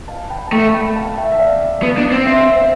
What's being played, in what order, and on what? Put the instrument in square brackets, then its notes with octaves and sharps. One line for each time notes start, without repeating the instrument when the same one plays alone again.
[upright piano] F5 A5
G5 B5
A5
[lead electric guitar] A3 [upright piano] E5 G5
[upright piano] G5 B5
F5 A5
E5 G5
E5
D5 F5
[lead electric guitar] B3
D4
C4
[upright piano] C5 E5
C5 E5
C5 E5